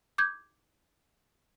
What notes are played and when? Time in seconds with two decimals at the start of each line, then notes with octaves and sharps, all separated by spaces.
0.18 D6 G6 G#6